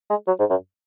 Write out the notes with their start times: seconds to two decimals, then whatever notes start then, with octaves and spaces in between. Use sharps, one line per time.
0.10 G#3
0.27 F#3
0.39 G#2
0.50 F#2